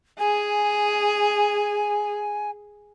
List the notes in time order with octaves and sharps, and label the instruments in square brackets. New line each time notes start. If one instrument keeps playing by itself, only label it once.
[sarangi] G#4 [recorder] G#5